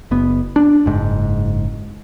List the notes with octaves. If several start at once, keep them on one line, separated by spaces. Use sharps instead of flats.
F#1 B3
D4
F#1 G#2